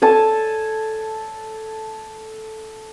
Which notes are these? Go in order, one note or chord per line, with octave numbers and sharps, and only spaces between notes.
A4 G#5 A5